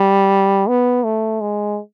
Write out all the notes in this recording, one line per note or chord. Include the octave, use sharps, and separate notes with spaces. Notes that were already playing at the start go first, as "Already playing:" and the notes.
Already playing: G3
B3
A3
G#3